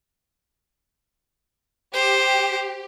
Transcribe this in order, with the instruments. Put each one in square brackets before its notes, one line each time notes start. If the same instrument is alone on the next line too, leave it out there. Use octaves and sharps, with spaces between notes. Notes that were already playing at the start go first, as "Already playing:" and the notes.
[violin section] G4 [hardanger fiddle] C5